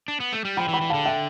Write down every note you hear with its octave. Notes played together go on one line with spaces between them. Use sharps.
D4
B3
A3
G3
F3 G5 B5
E3
G5 B5
E3
D3 F5 A5
E5 G5